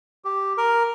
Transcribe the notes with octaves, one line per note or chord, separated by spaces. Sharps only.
G4
A#4